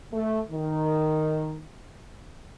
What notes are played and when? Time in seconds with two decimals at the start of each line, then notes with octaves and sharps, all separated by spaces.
0.13 A3
0.51 D#3